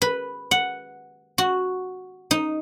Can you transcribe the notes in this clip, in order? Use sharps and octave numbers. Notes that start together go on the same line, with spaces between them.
B4
F#5
F#4
D#4